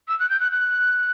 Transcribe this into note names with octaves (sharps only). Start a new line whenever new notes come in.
E6
F#6
G6
F#6
F#6